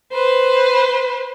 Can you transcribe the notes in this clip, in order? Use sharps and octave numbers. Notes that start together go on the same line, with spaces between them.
B4 C5